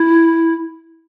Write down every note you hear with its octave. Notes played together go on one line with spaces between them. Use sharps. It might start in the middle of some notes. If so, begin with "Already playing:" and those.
Already playing: E4